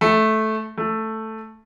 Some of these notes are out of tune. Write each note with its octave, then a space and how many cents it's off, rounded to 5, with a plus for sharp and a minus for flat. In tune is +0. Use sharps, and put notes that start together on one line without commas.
A3 -10
A3 +5